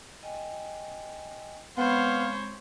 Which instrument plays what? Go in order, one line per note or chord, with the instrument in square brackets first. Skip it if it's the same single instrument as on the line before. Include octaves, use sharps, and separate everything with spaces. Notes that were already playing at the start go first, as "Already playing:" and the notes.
[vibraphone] D#5 G5 G#5
[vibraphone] G#3 C4 B5 [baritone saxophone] B3 [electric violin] C5 C#5 [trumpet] F5